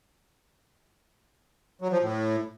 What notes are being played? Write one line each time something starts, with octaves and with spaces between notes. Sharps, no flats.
F#3
F3
A2